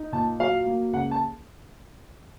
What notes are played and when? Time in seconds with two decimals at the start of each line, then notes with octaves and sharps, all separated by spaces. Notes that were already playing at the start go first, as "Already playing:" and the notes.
Already playing: D#4
0.12 A#2 A5
0.40 F#3 F5
0.66 A#3
0.93 C#2 F#5
1.11 A5